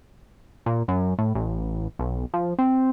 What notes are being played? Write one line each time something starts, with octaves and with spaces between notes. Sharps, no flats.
A#2
F#2
A2
A1
B1
F3
C4